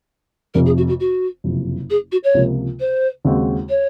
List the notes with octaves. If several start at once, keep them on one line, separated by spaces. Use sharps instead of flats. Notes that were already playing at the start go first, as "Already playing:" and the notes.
F1 F2 C3 A#4
G#4
F#4
F#4
F#4
F#1 F2 C3
G#4
F#4
C#5
C#2 C3 F3 A#3
C5
D#2 C#3 G#3 C4 F#4
C#5